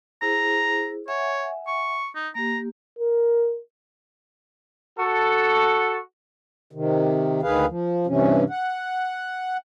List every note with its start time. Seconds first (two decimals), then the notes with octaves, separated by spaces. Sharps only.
0.22 E4 G#4 C5 A#5
1.08 C#5 E5 F#5 G#5
1.67 C#6
2.15 D#4
2.35 A#3 G4 A#5
2.99 A#4
4.99 F#4 A4
6.72 C3 D#3
7.42 D2 D#3 G#4 B4 F5
7.69 F3
8.07 G2 C3 E3 C#4
8.50 F#5